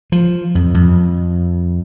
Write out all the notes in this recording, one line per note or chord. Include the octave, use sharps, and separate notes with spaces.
F3
F2
F2